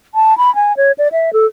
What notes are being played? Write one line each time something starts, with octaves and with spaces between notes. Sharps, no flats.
A5
B5
G#5
C#5
D5
E5
A4